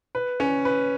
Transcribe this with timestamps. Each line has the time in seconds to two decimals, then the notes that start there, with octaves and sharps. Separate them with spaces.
0.15 B4
0.40 C#4
0.65 B4